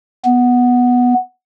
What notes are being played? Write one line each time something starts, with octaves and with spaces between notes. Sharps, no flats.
B3